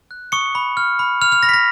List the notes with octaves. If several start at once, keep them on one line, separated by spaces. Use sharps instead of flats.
F#6
C#6 D#6 C#7
B5
F6
B5
F6 F7
F6 F7
B5 A#6
B6
A#6